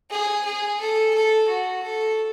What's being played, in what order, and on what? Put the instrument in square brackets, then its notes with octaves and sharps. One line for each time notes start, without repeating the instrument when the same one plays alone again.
[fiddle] G#4
G#4
A4
A4
F#4
A4